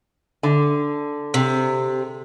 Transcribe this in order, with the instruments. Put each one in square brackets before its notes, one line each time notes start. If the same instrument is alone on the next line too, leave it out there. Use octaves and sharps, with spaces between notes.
[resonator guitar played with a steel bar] D3
[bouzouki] C3